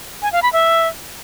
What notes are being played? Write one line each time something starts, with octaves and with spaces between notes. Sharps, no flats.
G#5
F5
B5
E5